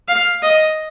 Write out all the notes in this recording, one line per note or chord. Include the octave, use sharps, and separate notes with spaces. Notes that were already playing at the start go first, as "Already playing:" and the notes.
F5
D#5